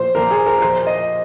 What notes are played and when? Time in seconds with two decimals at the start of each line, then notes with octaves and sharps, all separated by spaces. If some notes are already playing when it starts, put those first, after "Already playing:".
Already playing: A#2 F3 C5
0.15 A#2 F3 A#4
0.31 G#4
0.46 A#4
0.58 A#4
0.62 A#2 F3 C5
0.87 D#5